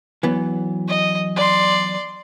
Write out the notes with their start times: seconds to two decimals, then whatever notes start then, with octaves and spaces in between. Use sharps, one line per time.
0.23 E3 F#3 B3
0.88 D#5
1.36 D5 C6